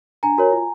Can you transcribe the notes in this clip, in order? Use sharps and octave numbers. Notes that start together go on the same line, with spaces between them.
D4 G#5 A#5
F#4 A#4 C#5
F4